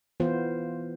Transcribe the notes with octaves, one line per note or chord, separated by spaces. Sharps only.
E3 B3 F4 C5